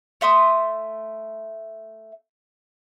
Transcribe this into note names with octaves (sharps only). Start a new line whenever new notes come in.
A3 E5 C6 D#6